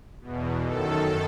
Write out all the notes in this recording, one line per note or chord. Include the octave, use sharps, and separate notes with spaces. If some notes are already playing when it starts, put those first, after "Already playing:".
E2 B2
F#2 D#3 A4